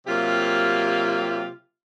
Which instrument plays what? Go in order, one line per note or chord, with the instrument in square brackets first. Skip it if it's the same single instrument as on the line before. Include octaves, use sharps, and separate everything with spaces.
[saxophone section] C3 F#3 A#3 F4 G4